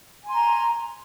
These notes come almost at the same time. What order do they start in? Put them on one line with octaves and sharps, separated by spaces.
G#5 C6 A#5